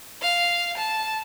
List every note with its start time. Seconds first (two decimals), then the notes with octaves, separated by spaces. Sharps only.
0.22 F5
0.78 A5